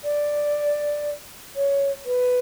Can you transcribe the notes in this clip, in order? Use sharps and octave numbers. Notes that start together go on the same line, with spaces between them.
D5
C#5
B4